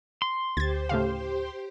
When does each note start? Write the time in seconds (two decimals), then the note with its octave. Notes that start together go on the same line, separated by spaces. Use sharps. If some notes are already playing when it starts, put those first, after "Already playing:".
0.22 C6
0.57 D2 G4 C5 G#6 A6
0.89 A2 C#3 F5